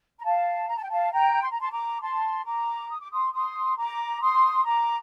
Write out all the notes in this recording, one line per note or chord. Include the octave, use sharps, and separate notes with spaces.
A#5
F5 A5
A#5
A5
G5
F5 A5
G5 A#5
C6
A#5
A5 C6
A#5 D6
A5 C6
A#5 D6
D#6
D6
C6 D#6
D6
C6 D#6
A#5 D6
C6 D#6
A#5 D6